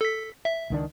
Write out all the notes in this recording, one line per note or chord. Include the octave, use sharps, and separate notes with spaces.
A4 B6
E5
C#2 D#3 D4